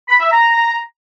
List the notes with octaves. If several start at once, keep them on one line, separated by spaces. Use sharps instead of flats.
B5
E5
A#5